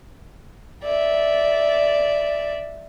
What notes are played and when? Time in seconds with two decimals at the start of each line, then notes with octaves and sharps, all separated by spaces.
0.83 D5 E5